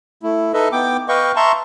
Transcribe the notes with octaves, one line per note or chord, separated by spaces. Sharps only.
A3 E4
D#4 A4 B4 D#5 E5
B3 G5 D6
B4 D#5 F5 G5 C#6
E5 A5 A#5 C6 C#6